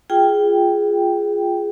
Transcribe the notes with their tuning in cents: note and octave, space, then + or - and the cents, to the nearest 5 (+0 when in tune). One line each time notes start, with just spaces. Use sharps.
F4 +0 G#4 +0 G5 +0